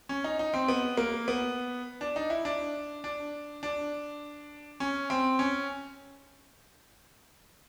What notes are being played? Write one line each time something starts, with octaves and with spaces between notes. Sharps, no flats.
C#4
D#4
D#4
C4
B3
A#3
B3
D4
D#4
E4
D4
D4
D4
C#4
C4
C#4